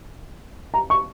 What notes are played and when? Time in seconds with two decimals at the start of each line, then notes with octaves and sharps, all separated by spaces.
0.74 A#5
0.90 C#6